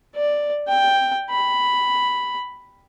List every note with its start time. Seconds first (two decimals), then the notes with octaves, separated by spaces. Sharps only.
0.16 D5
0.68 G5
1.31 B5